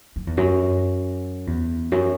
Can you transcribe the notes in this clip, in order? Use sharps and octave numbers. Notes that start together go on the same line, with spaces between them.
F#2
E2
F#2
E2
F#2